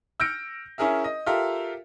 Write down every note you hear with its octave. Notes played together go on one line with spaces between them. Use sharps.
E6 F6 G6 A#6 C#7 D7
C#4 E4 G#4 A#4 E5
D#5
F4 G4 A4 A#4 E5 F5